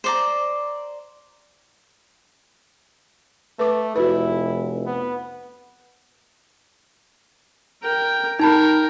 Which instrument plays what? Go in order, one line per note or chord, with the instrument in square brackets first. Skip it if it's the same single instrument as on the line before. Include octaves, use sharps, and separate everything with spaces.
[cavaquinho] C5 D5 A#5
[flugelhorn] A3 [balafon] B4 D6
[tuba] F1 [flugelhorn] E4 [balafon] F#4 B4
[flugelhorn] B3
[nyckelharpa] A#4 G5
[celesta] D#4 A5 B5 [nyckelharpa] A#4 G5